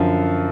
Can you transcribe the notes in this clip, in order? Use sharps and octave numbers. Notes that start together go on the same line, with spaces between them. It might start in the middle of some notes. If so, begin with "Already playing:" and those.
Already playing: F#2 D3 F3